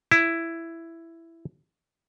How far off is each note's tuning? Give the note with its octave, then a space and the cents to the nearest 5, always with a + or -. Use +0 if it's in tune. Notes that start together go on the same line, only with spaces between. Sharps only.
E4 +10